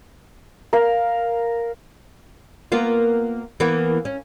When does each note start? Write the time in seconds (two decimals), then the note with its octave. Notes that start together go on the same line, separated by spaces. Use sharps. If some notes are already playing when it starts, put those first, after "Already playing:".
0.73 A#4 F5
2.72 A#3 B3 F4
3.60 E3 A#3 B3
4.05 C#4